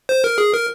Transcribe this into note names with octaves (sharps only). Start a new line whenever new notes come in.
C5
A#4
G#4
A#4